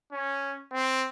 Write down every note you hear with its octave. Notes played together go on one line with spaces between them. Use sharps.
C#4
C4